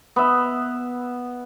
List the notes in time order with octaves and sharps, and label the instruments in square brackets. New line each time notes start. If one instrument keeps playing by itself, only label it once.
[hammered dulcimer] B3 E5